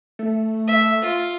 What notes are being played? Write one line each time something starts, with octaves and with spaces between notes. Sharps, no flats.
A3
E5
F4